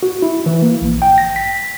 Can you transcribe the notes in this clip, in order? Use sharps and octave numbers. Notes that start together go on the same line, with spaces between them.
F#4
E4
E3
A#3
A#1
G5
A#6
B6